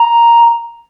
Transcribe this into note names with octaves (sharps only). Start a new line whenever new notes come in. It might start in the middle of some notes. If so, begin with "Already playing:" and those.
Already playing: A#5